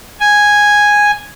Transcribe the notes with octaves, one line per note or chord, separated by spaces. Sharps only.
G#5